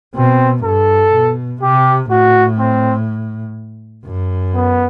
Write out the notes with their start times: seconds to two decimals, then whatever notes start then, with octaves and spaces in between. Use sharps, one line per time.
0.15 B2 C4
0.64 G2 A4
1.13 B2
1.62 C3 G4
2.10 A2 F#4
2.59 C4
4.05 F#2
4.54 B3